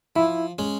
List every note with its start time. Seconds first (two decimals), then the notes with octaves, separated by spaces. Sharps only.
0.16 F3 E4
0.59 G#3 C#4